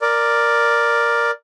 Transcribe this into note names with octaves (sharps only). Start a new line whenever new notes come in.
A#4 D5